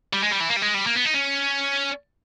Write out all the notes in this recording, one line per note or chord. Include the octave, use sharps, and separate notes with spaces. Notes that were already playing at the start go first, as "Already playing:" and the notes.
G3
G#3
G3
E3
A#3
G3
G#3
G3
A#3
B3
D#4
C#4